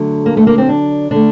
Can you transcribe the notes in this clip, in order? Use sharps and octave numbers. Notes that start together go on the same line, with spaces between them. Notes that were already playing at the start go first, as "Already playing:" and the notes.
Already playing: D3 F#3 A3
A#3
A3
A#3
C4
D4
D3 A3 D4